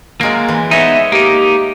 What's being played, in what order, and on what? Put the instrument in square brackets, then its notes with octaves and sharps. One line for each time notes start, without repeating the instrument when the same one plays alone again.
[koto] F#3 G#3 F4 [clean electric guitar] A#3
[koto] E3
[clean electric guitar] B3 D#4 [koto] C#5 D#5 [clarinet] E5
[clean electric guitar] A#3 D#4 [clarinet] G4